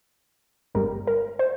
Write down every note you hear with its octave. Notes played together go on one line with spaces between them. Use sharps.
G1 G2 G3 A#4
A#4
C5